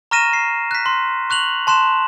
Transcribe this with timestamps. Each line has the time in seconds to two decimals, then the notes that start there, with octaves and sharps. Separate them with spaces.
0.11 A#5 C#6 F6 A#6 D#7 E7
0.33 C7
0.71 F#6 B6
0.86 C6
1.30 C#6 F#6 F7 F#7
1.67 A5 C6 F#6 E7